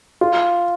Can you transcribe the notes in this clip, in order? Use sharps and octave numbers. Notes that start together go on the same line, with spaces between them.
F4